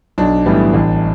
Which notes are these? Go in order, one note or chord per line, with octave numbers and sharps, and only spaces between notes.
B1 D4
A2 E3 G3 B3
A1